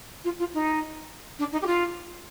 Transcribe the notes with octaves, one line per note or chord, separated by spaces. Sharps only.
F4
F4
D#4
D4
D#4
G4
F4